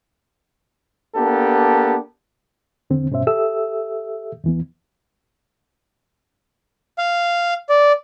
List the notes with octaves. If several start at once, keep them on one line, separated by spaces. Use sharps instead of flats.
A#3 B3 D4 G4 A4
E2 D3 C4
G2 B2 C#4 C5 E5
G4 A4 E5 D#6 E6
E2 E3 B3
F5
D5